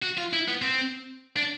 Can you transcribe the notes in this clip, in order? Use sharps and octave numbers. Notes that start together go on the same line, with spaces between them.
F#4
F4
E4
B3
C4
D4